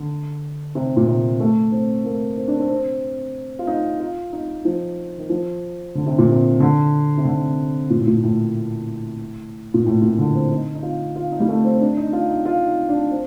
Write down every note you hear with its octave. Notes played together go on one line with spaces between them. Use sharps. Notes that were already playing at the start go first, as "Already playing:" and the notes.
Already playing: D3
C3
A#2
C3
A3
C4
A#3
C4
D4
C4
C4
F4
D#4
F4
D#4
F3
D#3
F3
D3
C3
A#2
C3
D3
C3
D3
A#2
A2
A#2
A2
A#2
A2
A#2
D3
C4
D#4
D#4
F4
F4
D#4
G3
A3
C4
D4
D#4
F4
D#4
F4
D#4
D4
C4